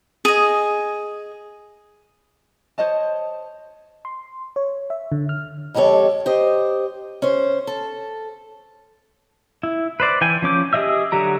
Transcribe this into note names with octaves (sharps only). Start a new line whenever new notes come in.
G#4 D#5
C5 C#5 D#5 A5
C6
C#5
E5
D3
F6
F2 G#3 G4 A4 C#5
G4 C5 D#5
C#4 C5
A4
E4
B4 C5 D5
E3 G5 G#5
F3 C#4 D6 G6
G4 G#4 D#5 E5 E6
D3 F#3 G4 A#5